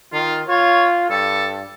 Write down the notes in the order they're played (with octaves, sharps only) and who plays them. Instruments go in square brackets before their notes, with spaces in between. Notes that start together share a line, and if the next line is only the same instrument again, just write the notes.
[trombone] D#3 [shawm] F4
[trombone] F4 [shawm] C#5
[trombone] G2 [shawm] A4